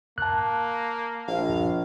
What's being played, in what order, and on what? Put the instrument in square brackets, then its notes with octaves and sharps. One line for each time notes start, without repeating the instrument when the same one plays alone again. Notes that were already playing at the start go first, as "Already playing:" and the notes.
[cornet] A#3 [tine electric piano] A5 F#6
[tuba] A#1 [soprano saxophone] F5